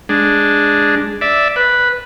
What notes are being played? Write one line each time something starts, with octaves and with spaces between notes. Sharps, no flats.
G#3 D4
D5 E5
B4